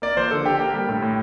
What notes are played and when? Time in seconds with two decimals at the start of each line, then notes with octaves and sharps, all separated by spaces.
0.02 A#3 D5
0.17 F3 C5
0.31 D3 A4
0.46 D3 G4
0.59 A#3 G4
0.74 G3
0.89 A2
1.02 A2